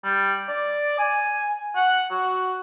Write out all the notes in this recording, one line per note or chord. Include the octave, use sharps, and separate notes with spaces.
G3
D5
G#5
F#5
F#4